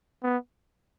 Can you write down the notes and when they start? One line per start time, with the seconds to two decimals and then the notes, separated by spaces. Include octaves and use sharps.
0.23 B3